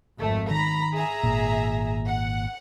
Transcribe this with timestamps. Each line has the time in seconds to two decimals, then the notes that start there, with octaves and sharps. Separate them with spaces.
0.20 G#1 F2 A3
0.51 D#3 A#5 B5
0.93 G#4 E5 A#5
1.23 G#1 A#2
2.07 F#5